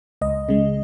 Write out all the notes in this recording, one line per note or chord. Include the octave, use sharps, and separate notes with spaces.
C#2 D#5
C#3 G#3